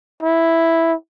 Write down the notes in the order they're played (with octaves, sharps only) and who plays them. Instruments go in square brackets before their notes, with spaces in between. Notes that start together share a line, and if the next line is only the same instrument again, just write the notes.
[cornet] E4